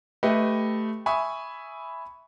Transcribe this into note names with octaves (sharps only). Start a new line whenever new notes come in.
A3 G4 B4 D#5 G5
E5 G#5 B5 C#6 D#6